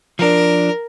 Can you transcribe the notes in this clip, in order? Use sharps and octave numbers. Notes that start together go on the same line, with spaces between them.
F3 D4 A#4